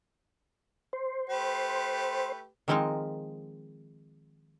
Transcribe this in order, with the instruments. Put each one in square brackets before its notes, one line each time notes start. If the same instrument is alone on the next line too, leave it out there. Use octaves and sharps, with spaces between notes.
[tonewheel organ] C5
[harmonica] A3 G4 B4
[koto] D#3 F3 G#3 C4 D#4 A#4